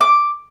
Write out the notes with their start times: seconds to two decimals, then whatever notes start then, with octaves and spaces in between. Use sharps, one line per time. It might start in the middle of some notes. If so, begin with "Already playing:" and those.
0.01 D6